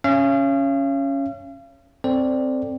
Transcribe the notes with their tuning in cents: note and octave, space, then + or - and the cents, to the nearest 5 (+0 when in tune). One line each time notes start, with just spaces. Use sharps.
C#4 +0 F5 -40
C4 +0 A4 +20 D5 +0